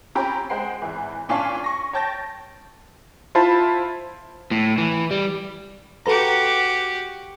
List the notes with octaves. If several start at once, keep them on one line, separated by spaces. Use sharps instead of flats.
C4 C#4 G4 G5 A#5 B5
G#3 C5 F#5 G5 C7
G#1 E3
A#2 C#4 D4 F5 A5 C#6
C#6 A#6
C#5 G5 A5 G6 A6 A#6
E4 F4 C5 A5 B5
A2
E3
G3
F#4 G4 A4 B4 A#5